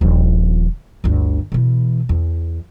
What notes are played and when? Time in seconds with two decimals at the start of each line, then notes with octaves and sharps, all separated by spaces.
0.01 D#1 F3
1.04 G1 D2
1.52 B2 E3
2.09 E2